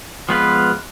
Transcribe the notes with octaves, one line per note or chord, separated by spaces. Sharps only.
F3 G#3 B3 F4 B4